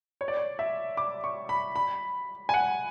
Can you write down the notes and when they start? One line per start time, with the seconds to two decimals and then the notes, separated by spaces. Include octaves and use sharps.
0.21 C#5
0.28 D5
0.37 C#5
0.59 E5
0.97 D6
1.24 C#6
1.49 B5
1.76 B5
2.49 G#5
2.54 F#5